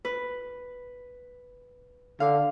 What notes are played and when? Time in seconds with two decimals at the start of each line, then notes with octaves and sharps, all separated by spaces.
0.05 B4
2.20 D3 F5